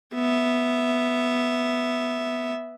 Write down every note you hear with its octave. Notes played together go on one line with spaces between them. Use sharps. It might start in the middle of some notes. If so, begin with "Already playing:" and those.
B3 E5